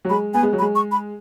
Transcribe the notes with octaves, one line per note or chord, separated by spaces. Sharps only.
F#3
G#3 B5
B3 G#5
G#3
F#3
B5
G#3
C#6
B5